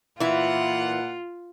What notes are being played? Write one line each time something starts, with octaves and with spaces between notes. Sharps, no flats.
A#2 E3 E4 F4 F#5